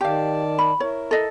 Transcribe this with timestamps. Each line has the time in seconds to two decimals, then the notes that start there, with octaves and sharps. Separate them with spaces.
0.01 D#3 G4 D5 F5 A5
0.59 B5
0.80 E4 A#4 C#5
1.11 A4 D#5